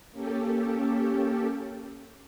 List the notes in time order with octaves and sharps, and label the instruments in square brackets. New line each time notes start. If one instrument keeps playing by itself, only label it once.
[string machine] A#3 C#4 G4 A4